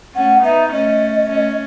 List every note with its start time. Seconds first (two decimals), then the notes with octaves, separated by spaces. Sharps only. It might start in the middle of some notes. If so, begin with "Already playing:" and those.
0.15 A3 C#4 F#5
0.44 B3 D#4 E5
0.73 A3 C#4 D#5
1.31 A3 C#4